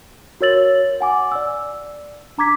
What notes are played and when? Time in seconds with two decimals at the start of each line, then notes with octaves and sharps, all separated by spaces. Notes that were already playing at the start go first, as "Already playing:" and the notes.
0.41 F#4 A#4 C#5 E6 A6 F#7
1.01 F#5 G#5 D6
1.32 D5 E6
2.38 D4 A#5 D6 G#6 B6